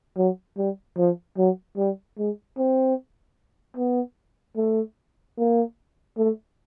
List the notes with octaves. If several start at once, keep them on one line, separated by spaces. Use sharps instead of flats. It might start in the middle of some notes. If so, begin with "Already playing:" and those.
F#3
G3
F3
F#3
G3
G#3
C4
B3
A3
A#3
A3